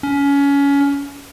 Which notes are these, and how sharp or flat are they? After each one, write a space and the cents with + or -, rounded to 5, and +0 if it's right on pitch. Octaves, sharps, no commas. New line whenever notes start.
C#4 +25